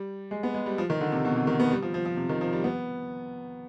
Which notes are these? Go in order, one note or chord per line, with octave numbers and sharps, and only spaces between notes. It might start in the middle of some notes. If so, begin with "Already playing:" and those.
Already playing: G3
G#3
B3
G#3
G3
F3
D#3
D3
C3
B2
C3
D#3
B3
G3
F3
F3
F3
C3
D#3
F3
G3
B3